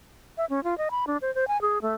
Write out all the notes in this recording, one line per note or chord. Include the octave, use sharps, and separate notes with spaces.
E5
C#4
F4
D#5
B5
D4
C5
C5
G#5
G#4
A3